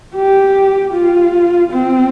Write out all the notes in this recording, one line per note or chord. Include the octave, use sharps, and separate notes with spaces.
G4
F4
C4